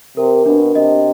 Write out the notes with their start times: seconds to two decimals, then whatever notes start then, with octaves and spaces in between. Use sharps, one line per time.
0.17 C3 A#4
0.46 B2 D4
0.75 C3 D#5